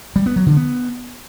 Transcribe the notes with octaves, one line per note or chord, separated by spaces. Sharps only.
G3
B3
F#3
D3
B3